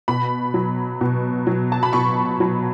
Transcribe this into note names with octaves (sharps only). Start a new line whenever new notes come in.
B2 B5
F#3
B2
F#3
A5
B5
B2 C#6
F#3